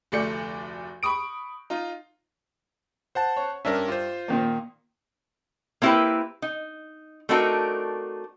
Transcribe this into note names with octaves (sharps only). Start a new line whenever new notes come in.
F1 D2 A3 D5 G6 C#7
B5 C#6 D#6 D7
D#4 F4
C5 F#5 A5
C#5
G2 C#4 D4 A#4 D5 E5
F4 C5
A#2 D#3 A#3
A#3 C4 E4 G4 A#4 B4
D#4
A3 C4 D4 D#4 F#4 A#4